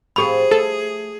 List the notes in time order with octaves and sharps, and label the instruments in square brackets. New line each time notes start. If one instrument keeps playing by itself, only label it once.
[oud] A2 F3 C4 [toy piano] G4 B5 [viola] G#4
[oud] A3 [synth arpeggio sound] A4